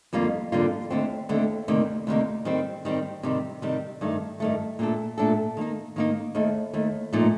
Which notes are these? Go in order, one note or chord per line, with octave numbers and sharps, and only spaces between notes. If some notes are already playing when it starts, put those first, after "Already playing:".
F2 D3 G3 A#3 F4
F2 D3 G3 A#3 F4
D#2 D3 A3 C4
D#2 D3 A3 C4
D2 C3 D#3 A#3
D2 C3 D#3 A#3
D#3 G3 C4
D#3 G3 C4
C3 D#3 G3
C3 D#3 G3
G2 D#3 A3
G2 D#3 A3
A#2 A3 D4 A4
A#2 A3 D4 A4
D#3 A#3 D#4
D#3 A#3 D#4
D#2 D#3 A3
D#2 D#3 A3
A#2 F3 A3 D#4